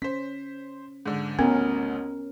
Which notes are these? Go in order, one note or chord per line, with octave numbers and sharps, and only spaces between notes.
C#4 C5 B6
G#2 D3
A1 D2 B3 C#4 A#4